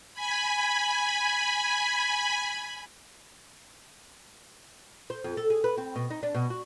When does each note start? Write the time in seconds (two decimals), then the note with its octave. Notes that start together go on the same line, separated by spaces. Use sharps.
0.13 G#5 B5
5.10 C5
5.24 F2
5.37 A4
5.50 G#4
5.64 B4
5.78 C4
5.96 B2
6.10 D#4
6.23 D4
6.35 B2
6.50 F#4